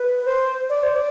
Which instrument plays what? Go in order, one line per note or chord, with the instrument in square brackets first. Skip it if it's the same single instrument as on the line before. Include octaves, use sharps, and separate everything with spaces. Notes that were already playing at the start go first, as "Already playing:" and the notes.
Already playing: [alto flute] B4
C5
D5
C5
D5